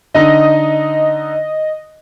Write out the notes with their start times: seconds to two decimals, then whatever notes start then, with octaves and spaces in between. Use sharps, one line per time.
0.15 D3 D#4 D#5